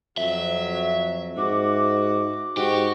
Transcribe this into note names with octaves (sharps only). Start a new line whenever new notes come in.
F2 F#3 E5
G#2 F#4 D6
G#2 F#4 G4 C#6